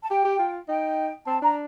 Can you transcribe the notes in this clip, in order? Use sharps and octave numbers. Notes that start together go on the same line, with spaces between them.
A5
G4 G5
G4
F4
D#4 G5
C4 A5
D4 A#5